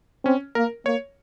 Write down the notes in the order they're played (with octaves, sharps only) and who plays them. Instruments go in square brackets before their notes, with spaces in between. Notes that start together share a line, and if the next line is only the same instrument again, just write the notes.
[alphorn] C4 [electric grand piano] C#4
[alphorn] A#3 [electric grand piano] A#4
[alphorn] A#3 [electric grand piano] C#5